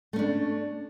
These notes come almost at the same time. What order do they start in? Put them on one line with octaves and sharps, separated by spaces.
A3 C#4 D4